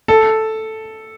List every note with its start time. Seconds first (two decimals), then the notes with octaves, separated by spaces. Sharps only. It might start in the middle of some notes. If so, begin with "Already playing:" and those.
0.08 A4